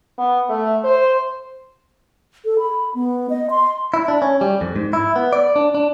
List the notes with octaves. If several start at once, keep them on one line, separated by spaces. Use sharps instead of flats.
B3
A3
C5
A4
B5
B3
D#5
C6
E4
D4
C#4
G3
F2
G#2
E4
B3
D5
D4
D4